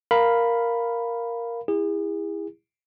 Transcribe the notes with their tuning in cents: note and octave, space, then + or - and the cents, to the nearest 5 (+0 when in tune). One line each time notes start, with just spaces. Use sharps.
A#4 +0 F5 +0 B5 +0
E4 +0 G#4 -35